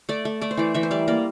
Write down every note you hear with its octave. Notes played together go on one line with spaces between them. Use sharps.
A3 D5
A3
A3 D5
C5
E3 D5
E3 E5
C5
G3 D5
A#3 D5